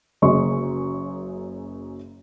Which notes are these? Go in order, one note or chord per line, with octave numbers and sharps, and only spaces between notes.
F#1 F#2 G#4 D#5 C6 C#6